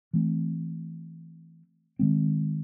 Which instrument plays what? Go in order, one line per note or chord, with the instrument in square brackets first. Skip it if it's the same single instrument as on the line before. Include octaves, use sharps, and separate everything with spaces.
[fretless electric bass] E3 A3 C4
D#3 G#3 C4